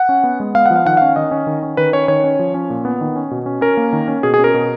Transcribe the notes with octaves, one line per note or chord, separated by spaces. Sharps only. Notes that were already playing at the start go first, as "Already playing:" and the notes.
Already playing: F#5
C#4
B3
G#3
B3 F5
F3 F#5
F5
D#3 F#5
C#4 F5
D#3 D#5
C#4
D#3
C#4
D#3 B4
C#4 C#5
D#3 C#5
C#4
F3
C#4
A#2
B3
D#3
C#4
B2
C#4
C#4 A#4
A#3
D#3
C#4
B2 G#4
G#4
C#4
A#4
B2